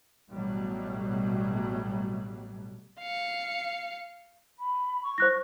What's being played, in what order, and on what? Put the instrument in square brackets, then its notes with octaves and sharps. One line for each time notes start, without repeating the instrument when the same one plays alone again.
[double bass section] A1 B2 F#3 G3 A3
[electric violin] F5 C#7
[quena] B5
C#6
[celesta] C5 F#6 A#6